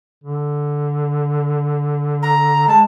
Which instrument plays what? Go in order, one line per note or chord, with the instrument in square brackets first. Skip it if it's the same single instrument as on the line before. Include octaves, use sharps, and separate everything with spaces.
[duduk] D3
[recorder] A#5
[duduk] G#3 [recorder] A5